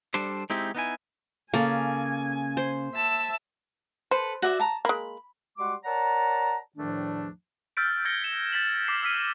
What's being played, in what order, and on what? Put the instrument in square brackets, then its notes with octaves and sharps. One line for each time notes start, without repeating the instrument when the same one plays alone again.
[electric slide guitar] G3 D4 A4 C5
G#3 C4 D#4 E4 G4
B3 D#4 E4 G#5
[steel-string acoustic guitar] C#3 [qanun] A#3 A4 [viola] G#5
[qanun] C5
[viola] E5 A5
[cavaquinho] A4 B4 [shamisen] C5
[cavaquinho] F#4 D5 E5
A5 A#5
[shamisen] G#3 A#3 [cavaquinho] B5
[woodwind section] G3 G#3 F#4 F#5 C6 D6
A#4 C#5 D5 F#5 A5 A#5
E2 A2 D#3 F3 A3 D4
[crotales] E6 F6 G6 A6 B6 D7
E6 G#6 A#6 C#7 G7
B6 E7
G6 A6 B6 F#7
D6 F6 B6 C7 E7
E6 F6 B6 D#7